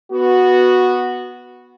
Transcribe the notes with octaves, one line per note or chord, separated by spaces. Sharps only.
B3 F#4